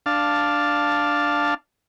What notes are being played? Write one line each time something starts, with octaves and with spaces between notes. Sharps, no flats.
D4 F5 A5